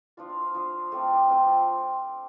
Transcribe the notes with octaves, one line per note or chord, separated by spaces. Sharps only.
F3 D4 F4 D5
F5
F5
F3 D4 F4 C5
A3 C4 F4 D5
F5
D5
A3 C4 F4 G5